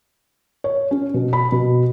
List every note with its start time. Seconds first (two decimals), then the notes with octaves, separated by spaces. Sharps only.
0.64 C#5
0.91 C#4
1.14 B2
1.33 B5
1.52 B2